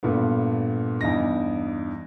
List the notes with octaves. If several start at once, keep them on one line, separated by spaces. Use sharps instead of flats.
G2 A#2 A3 B3
E2 G2 D#4 A#6